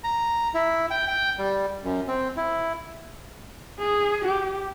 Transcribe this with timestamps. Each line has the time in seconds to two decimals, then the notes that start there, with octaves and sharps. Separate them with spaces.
0.04 A#5
0.54 E4
0.91 G5
1.08 G5
1.38 G3
1.84 F#2
2.08 C4
2.37 E4
3.79 G#4
4.25 G4